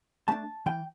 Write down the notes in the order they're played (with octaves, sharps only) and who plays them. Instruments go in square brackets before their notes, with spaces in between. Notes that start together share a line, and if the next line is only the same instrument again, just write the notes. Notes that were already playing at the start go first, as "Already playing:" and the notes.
[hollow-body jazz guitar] A3 D4 A5
E3 G5